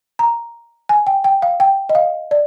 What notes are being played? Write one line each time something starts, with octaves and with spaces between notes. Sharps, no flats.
A#5
G#5
G5
G5
F5
G5
D#5
F5
D5